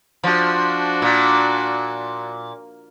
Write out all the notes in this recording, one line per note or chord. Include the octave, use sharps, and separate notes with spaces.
F3 D4 F#4
A#2